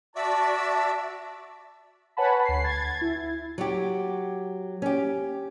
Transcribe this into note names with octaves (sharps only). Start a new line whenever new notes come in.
F#4 D5 E5 A5
B4 C#5 F#5 G#5 A5 B5
D2 C7
G#6 A6
E4
F#3 G4
C#4 G4